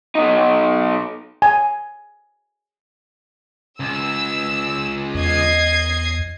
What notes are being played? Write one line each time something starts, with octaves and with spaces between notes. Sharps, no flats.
B2 D#4
G#5
C#2 E6
E2 D#5 G#6 C7